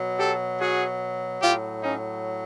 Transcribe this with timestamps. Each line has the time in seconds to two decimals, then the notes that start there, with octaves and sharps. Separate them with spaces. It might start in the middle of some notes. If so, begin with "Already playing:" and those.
Already playing: B2 F#3
0.19 G4 A4
0.59 F#4 G#4
1.42 A2 F#3 F4 G4
1.83 C#4 D#4